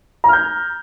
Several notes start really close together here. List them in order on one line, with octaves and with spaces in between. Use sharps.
A#5 F6 G6